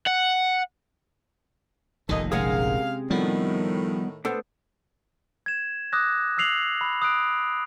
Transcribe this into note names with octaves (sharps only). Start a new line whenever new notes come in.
F#5
F1 A#1 D#2 A#2 D#3 A4 D#5
C3 G#3 C#4 G#4 A#4 F5 F#5
A2 D#3 F3 G3 B3
B3 D4 A4 C5
G#6 E7
D6 D#6 F#6 A#6
D#6 E6 F#6 C7 F7 F#7
B5
D#6 F#6 D7